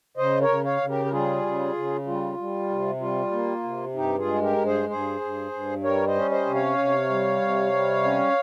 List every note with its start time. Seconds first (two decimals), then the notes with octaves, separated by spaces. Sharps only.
0.17 C#3 C5 D#5
0.41 A#4 C#5
0.48 C#3
0.64 C#5 F5
0.81 C#3
0.89 G4 A#4
1.05 A#4
1.12 G3 F4 G#4
1.43 C#3
1.74 C#3
2.06 G3 F4
2.37 G3
2.69 C3
3.00 G3 F4
3.32 A#3
3.64 C3
3.95 G2 D#4 G4
4.18 F4 G#4
4.26 G#3
4.42 G4 A#4
4.57 G2
4.65 G#4 C5
4.89 G2 G#4 C5
5.21 G2
5.52 G2
5.83 G3 A#4 C#5
6.07 C5 D#5
6.15 C#4
6.31 C5 D#5
6.46 C3
6.54 C#5 F5
6.78 C3
7.09 G3
7.41 C3
7.73 G3
8.04 C#4